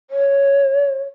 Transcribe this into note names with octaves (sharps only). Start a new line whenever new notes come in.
C#5